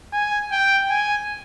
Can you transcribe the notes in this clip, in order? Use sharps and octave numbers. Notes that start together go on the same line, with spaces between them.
G#5
G5
G#5